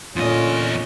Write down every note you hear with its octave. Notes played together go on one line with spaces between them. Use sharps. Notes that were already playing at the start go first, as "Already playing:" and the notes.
E2 A#2 D3 C#4 F4 D#5